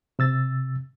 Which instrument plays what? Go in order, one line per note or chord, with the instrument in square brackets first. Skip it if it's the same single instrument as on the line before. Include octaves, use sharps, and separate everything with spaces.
[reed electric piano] C3 E6 A6